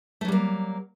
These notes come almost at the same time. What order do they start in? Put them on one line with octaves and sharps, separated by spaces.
A3 F#3 G3 A#3